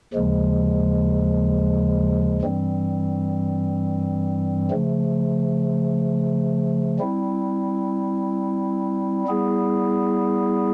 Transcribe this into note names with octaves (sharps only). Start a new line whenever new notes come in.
D#2 C#3 F3 G#3
G2 E3 G3 C4
C#3 F3 A3
G3 C4 E4
G3 B3 E4 G#4